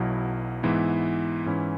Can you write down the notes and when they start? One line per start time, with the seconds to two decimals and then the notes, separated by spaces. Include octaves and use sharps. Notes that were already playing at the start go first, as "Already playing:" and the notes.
Already playing: B1 B2 F#3 E4
0.63 G#2 E3 B3 E4
1.46 G#2 E3 C#4 E4